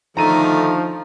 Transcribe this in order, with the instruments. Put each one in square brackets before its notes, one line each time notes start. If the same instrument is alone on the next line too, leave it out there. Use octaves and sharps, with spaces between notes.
[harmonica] D3 D#3 A3 [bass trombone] F3 [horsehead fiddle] D#4 [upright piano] A#5 D#7